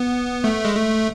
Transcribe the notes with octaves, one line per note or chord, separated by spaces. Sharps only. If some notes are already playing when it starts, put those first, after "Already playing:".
Already playing: B3
A3
G#3
A3